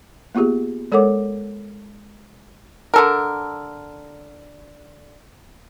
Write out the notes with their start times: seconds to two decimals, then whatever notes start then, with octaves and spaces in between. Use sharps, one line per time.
0.35 A#3 B3 F4 G4 G#4
0.92 G#3 A4 A#4 C#5 F#5 D6
2.94 D3 A4 A#4